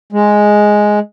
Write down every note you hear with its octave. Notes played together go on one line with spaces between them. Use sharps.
G#3